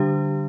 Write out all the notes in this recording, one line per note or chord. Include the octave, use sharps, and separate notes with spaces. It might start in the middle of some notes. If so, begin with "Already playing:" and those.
Already playing: D3 G3 D4 G4